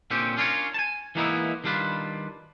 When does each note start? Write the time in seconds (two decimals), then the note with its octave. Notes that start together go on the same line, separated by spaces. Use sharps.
0.11 A#2 D3 C4 C#4 G4
0.37 C#4 D4 F4 G4 A#4 C#5
0.74 G#5 A5
1.15 E3 G#3 A#3 B3 D#4 E4
1.64 D#3 G3 D4 F4 B4